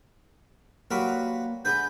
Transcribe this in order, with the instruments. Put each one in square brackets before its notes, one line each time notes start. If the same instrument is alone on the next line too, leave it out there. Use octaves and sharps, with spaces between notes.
[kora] F#3 G3 A#4 [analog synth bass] A#3 [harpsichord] F4 F#4 B4
[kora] D3 G#3 B3 [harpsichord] B4 [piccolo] G6